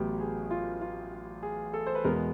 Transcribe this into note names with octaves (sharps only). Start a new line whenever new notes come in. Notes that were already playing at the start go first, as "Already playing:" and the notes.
Already playing: A1 A2 F#3 B3 G4
G#4
F4
F4
G#4
A4
C5
B4
E2 B2 G#3 B3 A#4